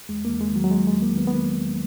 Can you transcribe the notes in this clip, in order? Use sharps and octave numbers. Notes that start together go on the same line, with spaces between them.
E2 G#3
E2 A#3
G#3
D#3 F#3
F#3
D#3 G#3
G#3
E2
A#3
D#3 B3
B3
D#3 A#3
E2